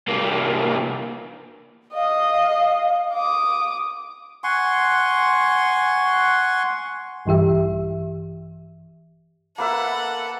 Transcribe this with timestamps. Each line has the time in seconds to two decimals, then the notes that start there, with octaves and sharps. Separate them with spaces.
0.08 C2 A#3
1.95 D#5 F5
3.14 D6 D#6
4.44 F#5 G#5 C6 C#6
7.26 A#1 G2 E3 G4 E5
9.58 A#3 A4 B4 E5 F#5